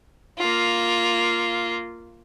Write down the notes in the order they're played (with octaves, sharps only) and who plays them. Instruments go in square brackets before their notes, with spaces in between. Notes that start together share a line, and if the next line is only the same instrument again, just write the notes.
[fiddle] A#3 F4